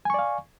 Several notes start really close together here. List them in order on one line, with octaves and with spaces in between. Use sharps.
G#5 C#6 D5 F5